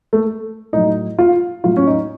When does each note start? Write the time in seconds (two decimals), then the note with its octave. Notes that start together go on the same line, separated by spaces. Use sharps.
0.13 A3
0.73 A2 F#3 D#4
1.19 F4
1.64 A2 F#3 F4
1.77 C#4
1.87 D#4